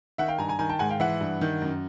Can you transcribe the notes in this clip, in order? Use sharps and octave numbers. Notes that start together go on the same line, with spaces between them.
D#3 E5 F#5
F5 G5
G2 G#5 A#5
G#5 A#5
D#3 G#5 A#5
G5 A5
G#2 F#5 G#5
F5 G5
E3 E5 F#5
G2
D#3
F#2